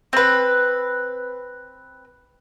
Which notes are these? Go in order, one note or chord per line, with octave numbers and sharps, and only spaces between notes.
C4 B4